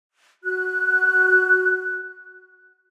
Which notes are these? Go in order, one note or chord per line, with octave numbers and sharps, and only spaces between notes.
F#4 F#6